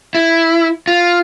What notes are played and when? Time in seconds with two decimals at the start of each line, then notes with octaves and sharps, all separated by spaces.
0.15 E4
0.88 F4